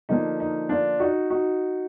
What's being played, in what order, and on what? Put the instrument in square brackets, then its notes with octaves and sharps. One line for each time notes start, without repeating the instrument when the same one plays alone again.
[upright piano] D3 F3 A#3 D#4
D#4
D4 F4
D#4 F#4
D#4 F#4